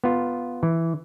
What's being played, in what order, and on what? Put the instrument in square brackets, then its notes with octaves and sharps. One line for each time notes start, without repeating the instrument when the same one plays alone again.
[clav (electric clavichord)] B3 F4
E3